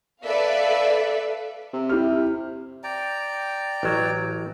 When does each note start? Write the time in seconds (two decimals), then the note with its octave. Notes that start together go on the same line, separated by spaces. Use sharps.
0.24 A4 B4 D5 E5 F5
1.73 C3
1.89 E4 G4 F6
2.84 D5 G5 A#5
3.83 A1 F#3